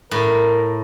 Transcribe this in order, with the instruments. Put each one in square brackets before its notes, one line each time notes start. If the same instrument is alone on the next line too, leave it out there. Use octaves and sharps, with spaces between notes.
[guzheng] A2 [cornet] A#4